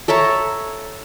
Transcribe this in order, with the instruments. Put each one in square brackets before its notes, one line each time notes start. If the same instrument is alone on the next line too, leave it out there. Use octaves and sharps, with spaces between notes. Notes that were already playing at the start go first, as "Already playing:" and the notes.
[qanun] A4 C#5 E5 A#5